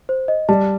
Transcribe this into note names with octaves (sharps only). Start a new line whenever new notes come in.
C5
D#5
G3 A5